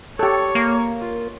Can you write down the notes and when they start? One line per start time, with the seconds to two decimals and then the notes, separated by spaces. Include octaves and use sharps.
0.19 G4 A4 C#5
0.55 A#3
1.00 F4